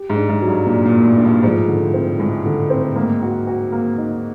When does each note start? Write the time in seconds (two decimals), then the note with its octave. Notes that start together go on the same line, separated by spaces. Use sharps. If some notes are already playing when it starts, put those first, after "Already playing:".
Already playing: G4
0.10 G#2
0.16 D4
0.29 G#2
0.42 F#3
0.48 G2
0.66 A#2 D4
0.86 A#2
0.92 A#3
1.05 A2
1.18 D4
1.25 G2
1.43 G#2 F3
1.68 D3
1.82 A2
1.94 C4
2.19 A2 G#3
2.46 D3
2.70 C4
2.96 G#2 A#3
3.22 F#4
3.47 F#4
3.72 A#3
3.98 D#4